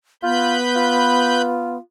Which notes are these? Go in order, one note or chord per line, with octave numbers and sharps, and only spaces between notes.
B3 F4 B4 B5 G6
F4